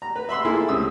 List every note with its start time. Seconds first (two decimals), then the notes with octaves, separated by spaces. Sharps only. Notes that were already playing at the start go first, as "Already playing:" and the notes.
0.02 A#5
0.16 B4
0.29 E5 B5 C6 E6
0.45 A#3 E4 G#4 A4
0.68 C#2 C3 D#6 E6